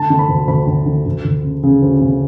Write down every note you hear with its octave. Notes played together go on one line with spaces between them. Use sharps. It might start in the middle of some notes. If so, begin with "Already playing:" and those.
Already playing: D3 A5
D3
B5
D2
D2 B5
D2
D3
D2
D2
C#3
C#3
D2
C#3